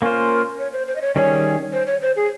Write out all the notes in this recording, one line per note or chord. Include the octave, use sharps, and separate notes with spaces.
A#3 C#4 F4 A#4 C5
C#5
C5
C5
D#5
C#5
D#3 G3 C#4 G#4 C#5
C5
C#5
C5
G#4